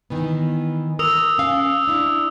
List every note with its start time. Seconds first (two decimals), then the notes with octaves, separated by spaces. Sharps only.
0.10 D#3 E3 B3
0.99 A#4 D#6 E6 F7
1.38 C#4 F5
1.87 D4 E4